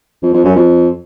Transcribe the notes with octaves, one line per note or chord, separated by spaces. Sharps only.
F2
F2
F#2
F2